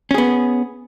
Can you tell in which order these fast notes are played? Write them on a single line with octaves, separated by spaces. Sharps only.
C#4 G#4 B3